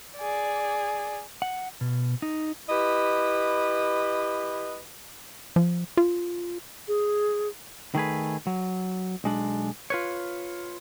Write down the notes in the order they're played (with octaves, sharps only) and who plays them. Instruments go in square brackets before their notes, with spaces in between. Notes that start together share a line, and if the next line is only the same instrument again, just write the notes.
[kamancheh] G#4 D5
[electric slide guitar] F#5
B2
D#4
[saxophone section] E4 G4 B4 D#5
[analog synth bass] F3
F4
[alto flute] G#4
[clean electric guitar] D#3 A3 G#4 B4
F#3
B1 G#3 D4
F4 B4 C#5